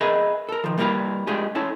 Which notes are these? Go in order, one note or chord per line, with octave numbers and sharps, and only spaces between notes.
G#4 A#4 B4 D#5 E5
A4 A#4
D#3 F3
G3 A#3 E4 F#4 A#4 B4
G#3 A3 D4 F4 G4 G#4
C#4 E4 A4